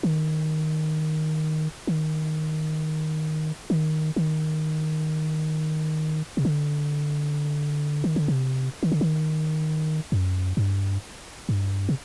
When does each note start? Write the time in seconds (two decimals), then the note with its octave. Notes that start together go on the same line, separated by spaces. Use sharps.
0.03 D#3
1.87 D#3
3.70 D#3
4.16 D#3
6.37 C3
6.45 D3
8.04 D#3
8.16 D3
8.28 C3
8.83 D#3
8.92 D3
9.01 D#3
10.12 F#2
10.57 G2
11.49 G2
11.89 C3